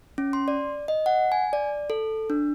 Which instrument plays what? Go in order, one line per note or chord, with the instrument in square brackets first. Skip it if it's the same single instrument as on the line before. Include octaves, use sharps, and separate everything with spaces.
[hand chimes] C#4
C6
D5
D#5
F#5
G#5
D5
A4
D4